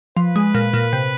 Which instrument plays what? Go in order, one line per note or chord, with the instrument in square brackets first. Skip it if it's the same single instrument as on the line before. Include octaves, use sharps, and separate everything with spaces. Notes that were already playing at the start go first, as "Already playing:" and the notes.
[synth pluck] F3 [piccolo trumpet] B4
[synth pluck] G#3
A#2
A#2
C3